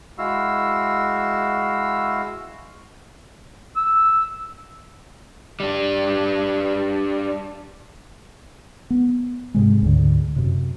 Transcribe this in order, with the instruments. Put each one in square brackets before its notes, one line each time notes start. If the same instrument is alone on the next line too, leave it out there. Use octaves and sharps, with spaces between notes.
[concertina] G#3 E4 F#4 F5 E6
[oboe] E6
[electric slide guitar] G3 D4
[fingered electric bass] B3
G#2 C3 G#3
D2 G#2 D3
F#2 C3